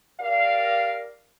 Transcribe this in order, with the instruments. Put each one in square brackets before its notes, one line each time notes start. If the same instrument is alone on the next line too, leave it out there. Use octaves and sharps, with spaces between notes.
[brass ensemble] G4 A#4 D5 F5